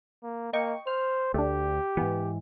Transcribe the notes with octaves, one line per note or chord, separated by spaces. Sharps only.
A#3
A#3 D#5 G5 C#6
C5 F6
D2 A3 D4 G4
G#2 E3 B3